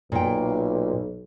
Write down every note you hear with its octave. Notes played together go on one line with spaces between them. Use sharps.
B1 A#2 G5